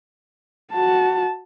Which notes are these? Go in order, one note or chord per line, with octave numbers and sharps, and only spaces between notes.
F#4 A5